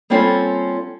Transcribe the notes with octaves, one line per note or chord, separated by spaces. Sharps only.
G3 A#3 C4 C#4 F4 A4